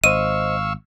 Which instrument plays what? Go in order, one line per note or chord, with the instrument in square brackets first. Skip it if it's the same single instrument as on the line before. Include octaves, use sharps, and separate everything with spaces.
[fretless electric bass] G#1 [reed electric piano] C5 D#5 [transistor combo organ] F5 C#6 E6 [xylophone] D#7